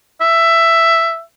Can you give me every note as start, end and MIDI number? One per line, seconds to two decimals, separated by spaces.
0.21 1.21 76